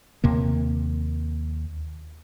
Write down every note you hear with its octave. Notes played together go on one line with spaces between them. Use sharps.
D#2 C3 A#3